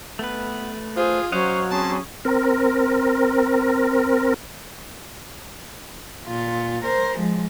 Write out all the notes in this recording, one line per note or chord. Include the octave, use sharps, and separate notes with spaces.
A3 B3 B4
F4 G#4 C5
F#3 C#4 C5 C#5 D#5 F5 F#5
C4 C#4 G#4 C5 A5
C4 A#4
A#2 F4
A#4 C5
F3 G#3